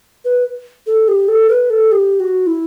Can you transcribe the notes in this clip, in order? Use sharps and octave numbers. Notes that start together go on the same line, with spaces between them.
B4
A4
G4
A4
B4
A4
G4
F#4
E4